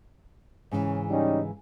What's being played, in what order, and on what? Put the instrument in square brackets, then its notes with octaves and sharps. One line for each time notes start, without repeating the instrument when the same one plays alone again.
[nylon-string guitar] G#2 C#3 E3 [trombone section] C#4
[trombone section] G3 C#4 D#4